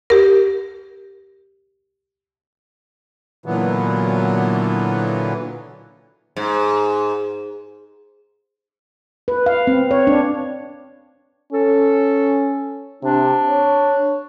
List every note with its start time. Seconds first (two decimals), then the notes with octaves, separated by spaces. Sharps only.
0.10 G4 A#4
3.46 A#2 D3 E3 F#3 B3
6.37 G#2
9.28 B4
9.46 F5
9.67 C4
9.91 C#5
10.07 D4
11.53 C#4 A4
13.03 C3 D4
13.50 C#5